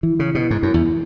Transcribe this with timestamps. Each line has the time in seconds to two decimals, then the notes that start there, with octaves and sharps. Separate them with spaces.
0.03 E3 E4
0.19 C#3
0.35 B2
0.51 G#2
0.63 F#2
0.74 E2